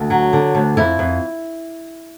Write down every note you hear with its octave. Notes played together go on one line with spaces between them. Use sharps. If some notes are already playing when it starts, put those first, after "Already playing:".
Already playing: D2
F#3
D3
D2
F2 E4
F2